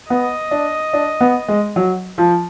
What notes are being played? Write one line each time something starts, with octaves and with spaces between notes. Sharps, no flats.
B3 D#5
D4
D4
B3
G#3
F#3
F3